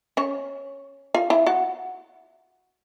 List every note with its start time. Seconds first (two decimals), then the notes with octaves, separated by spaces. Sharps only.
0.17 C#4 C#5
1.14 F4 F5
1.30 E4 E5
1.46 F#4 F#5